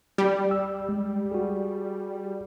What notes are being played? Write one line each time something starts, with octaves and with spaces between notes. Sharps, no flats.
G3
E6
G#3
F#4 G#4